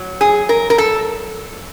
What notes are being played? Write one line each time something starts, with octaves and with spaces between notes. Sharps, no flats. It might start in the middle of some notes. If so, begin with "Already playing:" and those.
Already playing: F#3
G#4
A#4
A#4
A4